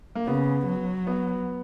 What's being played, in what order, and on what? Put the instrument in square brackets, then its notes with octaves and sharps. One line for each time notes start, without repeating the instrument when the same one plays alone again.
[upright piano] A#3
[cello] C#3 [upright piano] B3
[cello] F#3
[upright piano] B3